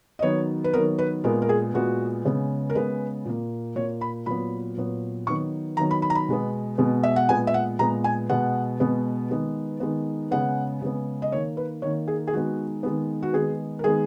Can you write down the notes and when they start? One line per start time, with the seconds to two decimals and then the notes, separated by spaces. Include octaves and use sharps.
0.19 D#5
0.22 D#3 F#3 B3 C#5
0.64 B4
0.73 D#3 F#3 B3 A#4
0.99 B4
1.24 A#2 G#3 B3 A#4
1.42 A#4
1.49 G#4
1.74 A#2 G#3 B3 F#4
2.25 C#3 G#3 B3
2.70 A#4
2.75 C#3 G#3 B3 B4
3.25 A#2 A#3
3.76 A#2 A#3 C#5
4.01 B5
4.26 A#2 F#3 B3 B5
4.77 A#2 F#3 B3
5.27 D#3 F#3 B3 C#6
5.77 D#3 F#3 B3 A#5
5.91 B5
6.02 B5
6.10 A#5
6.15 B5
6.29 B2 G#3 B3
6.78 B2 G#3 B3
7.03 E5
7.16 F#5
7.29 A#2 G#3 B3 G#5
7.47 E5
7.54 F#5
7.79 A#2 G#3 B3 A#5
8.04 G#5
8.29 B2 G#3 B3 F#5
8.80 B2 G#3 B3
9.30 D#3 G#3 B3
9.80 D#3 G#3 B3
10.31 C#3 G#3 B3 F#5
10.82 C#3 G#3 B3
11.22 D#5
11.32 D#3 A#3 C#5
11.57 B4
11.82 D#3 A#3 C#5
12.08 G#4
12.27 G#4
12.33 D#3 G#3 B3 F#4
12.83 D#3 G#3 B3
13.23 F#4
13.33 D#3 G#3 B3 G#4
13.79 A#4
13.84 D#3 G#3 B3 G#4